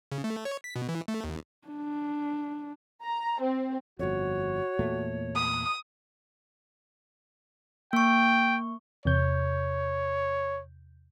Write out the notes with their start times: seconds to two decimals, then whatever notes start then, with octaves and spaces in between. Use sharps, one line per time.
0.12 C#3
0.24 A3
0.45 C#5
0.64 B6
0.76 B2
0.89 E3
1.08 A3
1.24 D#2
1.68 D4
3.03 A#5
3.40 C4
3.99 G1 F2 F#4 C#5
4.79 E2 A#2 A3
5.35 D#6
7.93 A#3 G5 C#6
9.05 E2 C3 C#5 G6